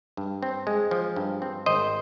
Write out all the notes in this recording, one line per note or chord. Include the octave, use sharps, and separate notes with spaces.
G2
C4
G#3
F3
G2
C4
G#1 C5 D#5